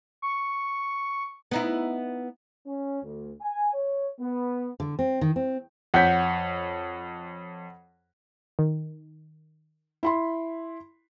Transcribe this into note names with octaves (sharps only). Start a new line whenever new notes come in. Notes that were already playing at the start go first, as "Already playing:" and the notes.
C#6
B3 D#4 E4
C#4
D2
G#5
C#5
B3
D3
C4
D#3
C4
F2 C#5 F#5 G6 B6
D#3
E4 B5 C6